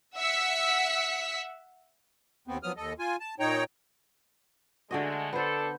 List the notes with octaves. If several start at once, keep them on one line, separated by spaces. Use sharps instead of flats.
E5 F#5 E6 B6 C#7
D#2 B3 C4
F3 F#3 B3 D#6 F6
D#2 A4 D#5
F4 G#5
A5
A#2 D#4 C#5 G5 A#5
D3 G#3 A3 F#4 D#5
B3 D4 A4 C5